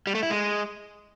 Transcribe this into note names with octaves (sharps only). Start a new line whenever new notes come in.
G3
A3
E4
G#3